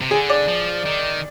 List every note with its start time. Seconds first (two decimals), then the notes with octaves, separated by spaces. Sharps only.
0.01 C3
0.11 D3 G#4
0.29 D5
0.48 F3
0.86 D#3